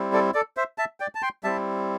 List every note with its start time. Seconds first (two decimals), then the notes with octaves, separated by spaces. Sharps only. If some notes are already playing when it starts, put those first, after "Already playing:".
Already playing: G3 C4 E4
0.13 A4 D5
0.34 A4 D5
0.57 C5 E5
0.78 E5 A5
1.00 D5 G5
1.15 A5
1.22 G5 C6
1.44 G3 C4 E4 E5 A5